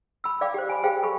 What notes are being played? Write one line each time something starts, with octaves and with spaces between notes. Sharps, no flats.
B5 E6
D5 F5 G5 D6
G4 C5
G#5 B5
G4 G#4 C5 F5 G5
A4 B5 C#6